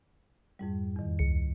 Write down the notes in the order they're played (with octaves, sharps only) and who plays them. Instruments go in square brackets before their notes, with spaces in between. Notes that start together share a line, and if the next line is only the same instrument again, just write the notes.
[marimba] F2 G#2 G3
E2 D#3
[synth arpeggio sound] C#2 C#7